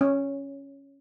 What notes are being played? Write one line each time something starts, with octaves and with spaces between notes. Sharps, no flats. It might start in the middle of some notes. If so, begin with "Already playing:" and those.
C#4